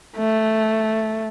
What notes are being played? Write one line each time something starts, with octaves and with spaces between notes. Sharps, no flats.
A3